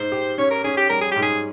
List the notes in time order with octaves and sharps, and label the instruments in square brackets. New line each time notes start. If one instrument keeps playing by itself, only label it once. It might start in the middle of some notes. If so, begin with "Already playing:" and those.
Already playing: [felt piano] G#2 [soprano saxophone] C5
[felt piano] G4
[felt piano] C#4 [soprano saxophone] C#5
[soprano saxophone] A#4
[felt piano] C#4 [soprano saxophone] G#4
[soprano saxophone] G4
[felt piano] G3 [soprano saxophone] A#4
[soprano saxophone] G#4
[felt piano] G#2 [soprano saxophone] G4
[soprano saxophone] G#4